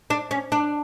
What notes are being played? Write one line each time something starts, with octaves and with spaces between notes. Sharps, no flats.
D4
C#4
D4